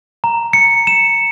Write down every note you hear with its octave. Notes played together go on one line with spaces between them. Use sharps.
A#5
C#7
E7